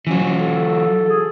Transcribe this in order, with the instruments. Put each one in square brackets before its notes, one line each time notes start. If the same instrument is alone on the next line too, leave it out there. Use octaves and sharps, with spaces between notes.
[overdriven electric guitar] E3 F#3 [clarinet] C#4
[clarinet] A4
G#4